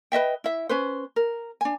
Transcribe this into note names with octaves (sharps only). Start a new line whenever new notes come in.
B4 D#5 E5 G5
E4 E5
C#4 B4 C5
A#4
D4 G#5